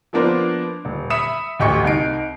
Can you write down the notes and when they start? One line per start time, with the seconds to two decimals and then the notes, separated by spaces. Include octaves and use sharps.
0.13 F3 A#3 B3 D4 A#4 C5
0.85 D#1
1.10 E5 B5 D#6 B6 C#7 E7
1.59 A1 D2 G4 D#5 C#6 C#7
1.85 C2 D#4 C7 D7